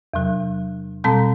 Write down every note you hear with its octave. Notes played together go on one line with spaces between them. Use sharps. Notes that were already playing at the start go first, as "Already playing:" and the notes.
E2 C3 F#3
B2 G3 C4 A5